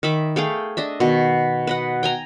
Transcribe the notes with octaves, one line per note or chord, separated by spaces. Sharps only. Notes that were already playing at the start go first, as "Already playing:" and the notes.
D#3 E5 B5 D6
A3 G#4 F5 G5
D4 D#5 E5
B2 D#3
B4 D#5 F#5
G5 G#5 A#5